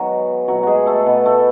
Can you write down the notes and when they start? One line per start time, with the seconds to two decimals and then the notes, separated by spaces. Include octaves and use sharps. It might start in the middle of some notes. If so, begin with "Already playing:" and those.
Already playing: D#3 F#3 G#3 B3 F#4
0.47 B2 F#3 A3 F#4
0.63 G#3 F#4 G#4
0.86 A3 A4
1.06 B2 A3 B3 B4
1.25 A3 A4